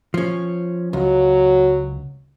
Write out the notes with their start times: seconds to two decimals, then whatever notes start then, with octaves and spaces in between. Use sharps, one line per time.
0.14 F3 C#4
0.93 C#2 F#3